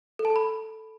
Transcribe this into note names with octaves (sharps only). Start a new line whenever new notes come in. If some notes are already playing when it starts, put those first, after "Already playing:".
A4
A5
A4
B5